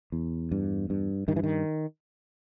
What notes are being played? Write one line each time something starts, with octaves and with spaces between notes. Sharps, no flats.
E2
G2
G2
G2 D#3
E3
D#3